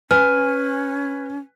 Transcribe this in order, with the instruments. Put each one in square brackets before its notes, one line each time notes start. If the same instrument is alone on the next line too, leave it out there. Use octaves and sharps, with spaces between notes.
[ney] C#4 [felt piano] B4 [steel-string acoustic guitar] G#5 [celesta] F6